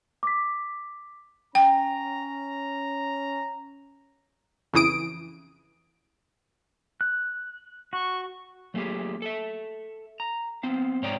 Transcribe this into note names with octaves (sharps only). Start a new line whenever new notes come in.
D6 B6
C#4 G5 A#5
F2 C#3 E3 D#6 D7
F#6
F#4 C#6
F#3 A3 A#3 G4 G#4
A4 E5
A#5
B3 C4 F5
G#2 C#5 D5 G5 A#5